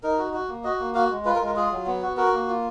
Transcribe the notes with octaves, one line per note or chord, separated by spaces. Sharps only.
D#4 A#4
F#4
F#4
A#3
F#4 D#5
A#3
F#4 F5
G#3
F4 B4
A#4
G#3
A#4
F4 G#4
F#3
B3
F#4
F#4 A#4
A#3
F4